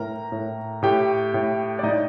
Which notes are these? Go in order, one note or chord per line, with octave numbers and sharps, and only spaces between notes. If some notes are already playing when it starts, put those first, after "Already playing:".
Already playing: A2 A#4 A#5
A2
A2 G4 G5
A2
D5
A2 D#4 D#5